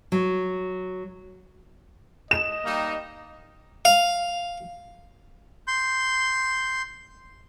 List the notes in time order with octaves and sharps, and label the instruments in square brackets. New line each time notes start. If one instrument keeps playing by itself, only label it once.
[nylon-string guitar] F#3
[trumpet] D#5 [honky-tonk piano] E7
[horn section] G3 A#3 D#4
[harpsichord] F5
[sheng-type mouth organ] C6 G6